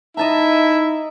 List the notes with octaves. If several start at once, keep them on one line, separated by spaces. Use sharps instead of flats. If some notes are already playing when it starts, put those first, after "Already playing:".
D#4 E4 D#5 E5 A5 A#5